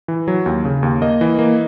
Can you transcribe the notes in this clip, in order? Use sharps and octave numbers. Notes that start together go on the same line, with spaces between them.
E3
F#3
D#2
C#3
D#2
A#3 D#5
E3
A#3